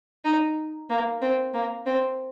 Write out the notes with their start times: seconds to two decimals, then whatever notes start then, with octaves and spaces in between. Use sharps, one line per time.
0.25 D#4
0.90 A#3
1.22 C4
1.54 A#3
1.86 C4